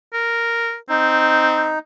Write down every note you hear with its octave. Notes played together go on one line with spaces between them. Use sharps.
A#4
C4 D#4